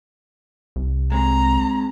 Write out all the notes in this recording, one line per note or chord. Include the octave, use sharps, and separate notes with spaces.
C2
G#3 C4 G#4 A#5